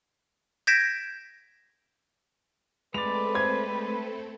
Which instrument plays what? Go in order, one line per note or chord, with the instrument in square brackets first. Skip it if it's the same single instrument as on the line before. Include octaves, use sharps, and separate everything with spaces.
[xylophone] G6 G#6 A#6 B6 D7 E7
[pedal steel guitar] G#3 D5 [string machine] A3 C4 A4 [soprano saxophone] B4 [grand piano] F7
[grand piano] C5 G#6